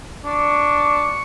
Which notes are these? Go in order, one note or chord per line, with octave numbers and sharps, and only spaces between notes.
D4 C#6